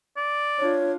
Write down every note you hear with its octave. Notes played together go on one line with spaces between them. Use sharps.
D5
D4 F4 C#5